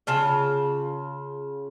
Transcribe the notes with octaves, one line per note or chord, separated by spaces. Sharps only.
C#3 F4 A5